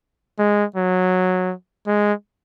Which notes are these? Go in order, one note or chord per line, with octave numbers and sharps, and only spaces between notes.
G#3
F#3
G#3